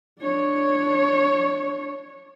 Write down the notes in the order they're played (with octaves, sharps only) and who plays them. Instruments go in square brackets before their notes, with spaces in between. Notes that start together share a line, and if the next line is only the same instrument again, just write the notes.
[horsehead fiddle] D4 C#5